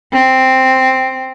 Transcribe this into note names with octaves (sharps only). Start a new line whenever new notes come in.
C4